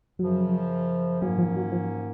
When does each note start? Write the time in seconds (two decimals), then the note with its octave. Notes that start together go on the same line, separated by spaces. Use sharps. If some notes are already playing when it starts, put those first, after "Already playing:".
0.19 F#2 C#3 F3 F#3
1.21 G#2 D#3 F#3 A#3 C#4
1.38 F3
1.56 F#3
1.72 F3